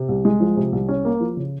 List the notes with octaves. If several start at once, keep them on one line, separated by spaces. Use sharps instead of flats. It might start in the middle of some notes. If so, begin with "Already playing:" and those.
Already playing: C3
C2
G#3
F3
C3
C2
C#4
A#3
F3
C#3